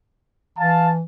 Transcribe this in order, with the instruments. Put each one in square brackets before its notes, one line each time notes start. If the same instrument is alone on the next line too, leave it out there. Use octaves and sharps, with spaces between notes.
[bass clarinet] E3 [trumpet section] F5 A5